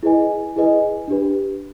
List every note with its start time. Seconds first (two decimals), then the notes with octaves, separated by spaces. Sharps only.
0.03 E4 G#4 B4 D#5 G#5
0.56 E4 G#4 B4 D#5 G#5
1.08 D4 G4 B4